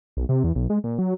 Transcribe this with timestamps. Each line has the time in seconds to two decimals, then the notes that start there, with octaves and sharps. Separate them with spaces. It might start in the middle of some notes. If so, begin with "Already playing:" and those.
0.17 B1
0.29 C3
0.44 E2
0.56 B1
0.70 G#3
0.84 A#2
0.99 F#3